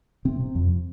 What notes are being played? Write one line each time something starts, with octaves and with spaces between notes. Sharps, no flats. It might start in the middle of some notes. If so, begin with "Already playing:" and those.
C3 C4
C3
F2